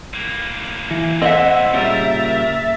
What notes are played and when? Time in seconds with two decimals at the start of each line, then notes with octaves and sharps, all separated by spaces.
0.14 A2 A#3
0.91 E3
1.22 C4 D#5 E5 F#5
1.74 A#2 C#3 G3 A#4 E5 A6